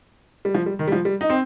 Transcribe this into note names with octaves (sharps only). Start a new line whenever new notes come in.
G3
F3
G3
D#3
G3
F3
G3
D#4
C4